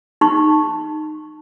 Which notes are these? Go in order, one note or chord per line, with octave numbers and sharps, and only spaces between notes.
D#4 C#6